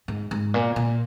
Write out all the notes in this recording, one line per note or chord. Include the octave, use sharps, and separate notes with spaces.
G#2
G#2
A#2
A#2